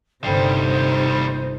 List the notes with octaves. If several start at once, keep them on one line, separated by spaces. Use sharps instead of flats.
G1 D#2 C3 G3 D#4 C5 G5 C7